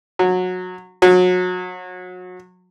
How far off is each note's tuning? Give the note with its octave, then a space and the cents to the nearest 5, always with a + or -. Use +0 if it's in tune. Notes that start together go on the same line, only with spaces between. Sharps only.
F#3 -20
F#3 -30